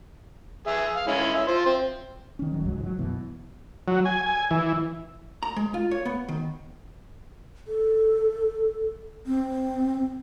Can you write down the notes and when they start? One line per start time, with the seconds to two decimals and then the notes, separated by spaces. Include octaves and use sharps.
0.67 G#4 E5
0.96 F5
1.07 G#3 C#4 E4
1.35 E5
1.47 F4 C5
1.66 C4
2.39 D#3 C#4
2.52 D#1 F#3
2.65 C#2 G#2 F#3
2.80 F3 F#3
2.99 F#2 B2 E3
3.88 F#3
4.05 G#5
4.26 G#5
4.51 E3
5.43 A#5
5.56 G#3
5.74 F4
5.91 C#5
6.05 B3
6.29 D#3
7.67 A4
9.27 C4